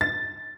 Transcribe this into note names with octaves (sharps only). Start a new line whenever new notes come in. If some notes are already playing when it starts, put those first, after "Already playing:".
A6